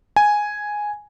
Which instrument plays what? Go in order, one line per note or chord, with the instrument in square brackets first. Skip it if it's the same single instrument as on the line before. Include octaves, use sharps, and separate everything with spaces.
[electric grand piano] G#5